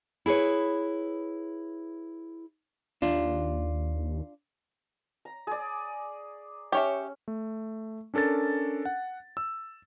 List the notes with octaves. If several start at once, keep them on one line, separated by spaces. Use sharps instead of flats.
E4 G#4 B4 C#5
D#2 D4 F4
A#5
G#4 D5
C#4 G4 C#5 E5
A3
C#4 D4 A4 A#4 A6
F#5
E6